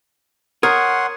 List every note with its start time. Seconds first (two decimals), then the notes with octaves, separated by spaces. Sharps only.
0.63 A#4 C#5 F#5 C6 D#6 G#6